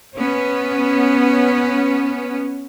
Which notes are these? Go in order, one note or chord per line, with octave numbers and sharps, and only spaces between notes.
B3 C#4